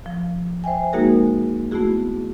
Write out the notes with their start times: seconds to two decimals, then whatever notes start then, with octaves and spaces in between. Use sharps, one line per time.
0.06 F3
0.64 C5 E5 G5 G#5
0.93 G#3 A#3 D#4 F#4 G#4 A#4
1.71 A3 B3 E4 F#4 G#4